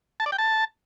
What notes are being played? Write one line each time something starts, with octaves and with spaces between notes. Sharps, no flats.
A5
D5
G5
A5